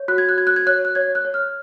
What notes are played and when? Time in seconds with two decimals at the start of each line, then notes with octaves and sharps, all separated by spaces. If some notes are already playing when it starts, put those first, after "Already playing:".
Already playing: C#5
0.08 F#4 F#6
0.18 G#6
0.29 F#6
0.38 F#4 G#6
0.47 F#6
0.56 G#6
0.67 C#5 F#6
0.85 F#6
0.95 C#5 G#6
1.15 F#6
1.25 C#5
1.34 F6